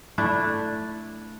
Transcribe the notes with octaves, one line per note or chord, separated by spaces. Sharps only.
A3 D4 E4